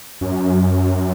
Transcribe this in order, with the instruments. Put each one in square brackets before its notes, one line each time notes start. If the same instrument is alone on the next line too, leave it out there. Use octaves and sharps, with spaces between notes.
[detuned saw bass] F#2